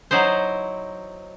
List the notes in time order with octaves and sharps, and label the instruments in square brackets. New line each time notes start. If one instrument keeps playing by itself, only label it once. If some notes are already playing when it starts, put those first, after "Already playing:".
[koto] F#3 D#4 E4 C5